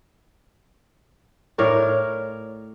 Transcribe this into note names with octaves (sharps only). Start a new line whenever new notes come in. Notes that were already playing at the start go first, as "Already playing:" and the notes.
A2 A#4 C#5 D5